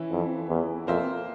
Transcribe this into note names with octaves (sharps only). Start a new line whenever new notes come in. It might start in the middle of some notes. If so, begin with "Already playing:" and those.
Already playing: E3 C#4 E4
F2
E2
F2 A#3 F4 C5 E5